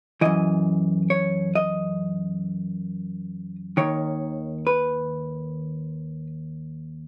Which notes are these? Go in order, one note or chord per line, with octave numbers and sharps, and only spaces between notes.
F#2 E3 D#5
C#5
D#5
D#2 D#3 C#5
B4